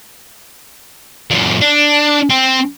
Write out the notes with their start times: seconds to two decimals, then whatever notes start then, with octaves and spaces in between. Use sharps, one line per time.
1.30 F#2 A#2
1.61 D4
2.29 C4